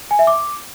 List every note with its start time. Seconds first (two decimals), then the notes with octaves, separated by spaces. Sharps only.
0.11 G#5
0.19 E5
0.27 D6